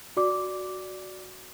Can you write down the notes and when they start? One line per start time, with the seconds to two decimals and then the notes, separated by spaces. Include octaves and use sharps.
0.17 F#4 D5 D6